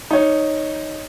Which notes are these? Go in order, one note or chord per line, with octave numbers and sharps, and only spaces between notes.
D#4 C#5